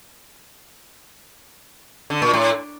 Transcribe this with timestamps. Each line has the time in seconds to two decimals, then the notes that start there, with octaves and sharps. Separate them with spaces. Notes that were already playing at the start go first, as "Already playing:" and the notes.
2.10 D3
2.22 A#2
2.33 A2